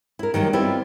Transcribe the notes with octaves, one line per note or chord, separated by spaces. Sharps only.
E4 A#4
D#3 F#3 G3 A#3
G3 B3 C4 E4 F4 G4